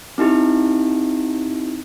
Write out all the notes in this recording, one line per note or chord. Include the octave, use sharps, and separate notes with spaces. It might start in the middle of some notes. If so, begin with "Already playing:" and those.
C4 D#4 E4 G4